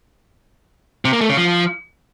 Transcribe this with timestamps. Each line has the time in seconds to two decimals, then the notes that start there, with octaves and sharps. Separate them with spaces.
1.05 C3
1.13 A#3
1.21 A3
1.29 C#3
1.37 F3